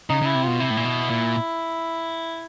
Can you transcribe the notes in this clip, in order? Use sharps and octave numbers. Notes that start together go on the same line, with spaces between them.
C#3 D#4
C#3 E4
C3
B2 F4
C3 E4
A2
A#2
B2
A#2